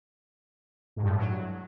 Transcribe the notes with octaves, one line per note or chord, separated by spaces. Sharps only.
G#2
G2
A2
F#3